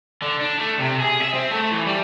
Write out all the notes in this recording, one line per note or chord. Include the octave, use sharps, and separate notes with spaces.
D3
D4
A3
C3
G#4
E5
C4
A3
E3
G3